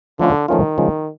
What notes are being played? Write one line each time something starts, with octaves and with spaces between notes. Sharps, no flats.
D3 F3 A3 C#4 F4
D#3 F3 A3 C#4 F4
C#3 F3 G#3